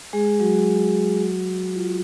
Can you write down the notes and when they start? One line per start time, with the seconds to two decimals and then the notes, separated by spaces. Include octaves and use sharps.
0.13 G#3 G#4
0.39 F#3 F#4
1.75 F4